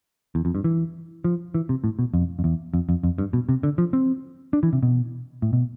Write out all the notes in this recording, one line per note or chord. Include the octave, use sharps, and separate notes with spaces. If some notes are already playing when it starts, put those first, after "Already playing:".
E2
F2
G2
E3
F3
E3
C3
A2
B2
F2
F2
E2
F2
F2
F2
G2
B2
C3
D3
F3
C4
D4
E3
C3
B2
A2
B2